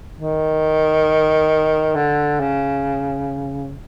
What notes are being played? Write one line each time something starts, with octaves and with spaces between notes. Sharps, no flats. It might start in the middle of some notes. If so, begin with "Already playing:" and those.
D#3
D3
C#3